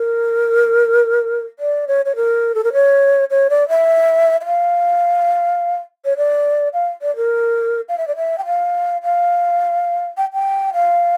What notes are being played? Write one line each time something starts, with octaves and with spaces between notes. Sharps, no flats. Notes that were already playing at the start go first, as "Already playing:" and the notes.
Already playing: A#4
D5
C#5
C#5
A#4
A4
A#4
C#5
C#5
D5
E5
E5
F5
C#5
D5
F5
D5
A#4
F5
E5
D5
E5
G5
F5
F5
G5
G5
F5